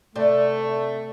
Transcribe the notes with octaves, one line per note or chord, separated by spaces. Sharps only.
C3 A3 C5 D5